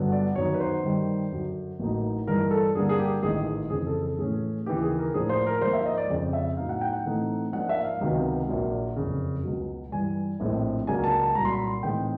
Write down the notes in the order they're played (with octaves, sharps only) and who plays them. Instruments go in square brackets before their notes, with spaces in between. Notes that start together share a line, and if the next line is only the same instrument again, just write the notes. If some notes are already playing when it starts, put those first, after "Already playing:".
Already playing: [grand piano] G1 G2 D3 F#3 B3
D5
F#2 D#3 F#3 B3 D#4 C#5
B4
C5
G2 D#3 G3
F#2 D3 F#3
A1 A2 F#3 A#3 D#4
G2 E3 G#3 A#4
A4
G2 D3 G3 A#3 D4 G#4
G#4
G4
A1 G#2 D#3 G#4
G#4
F2 C#3 E3 G#4
A4
A4
A2 E3 A3 C#4 G#4
D#2 C#3 E3 G4
G#4
A#4
A2 F3 A#3 D4 G#4
C5
A#4
G#2 F3 A#3 C5
E5
D#5
D5
F2 C#3 F3
E5
A2 F#3 B3 D#4 F5
F#5
G5
F#5
A2 E3 A3 C4 D#4
G#2 F3 A#3 D4 F#5
E5
F5
C#2 C3 D#3 F#3 B3
A#1 A#2 F#3
F#1 F2 C#3
C#2 B2 F#3
G2 E3 G3 G#5
A#1 A2 F3 G#3 C4
C#2 C#3 F#3 A#3 D4 G#5
A5
A5
C2 A#2 F#3 A#5
C6
B5
C6
A2 E3 G#3 C4 D#4 G5